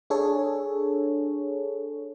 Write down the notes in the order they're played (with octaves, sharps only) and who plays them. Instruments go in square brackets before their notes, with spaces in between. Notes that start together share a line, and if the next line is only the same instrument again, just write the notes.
[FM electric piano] D4 G#4 A4 C#5